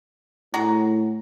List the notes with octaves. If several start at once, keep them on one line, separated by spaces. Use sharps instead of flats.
A2 F#4 G#4 A#5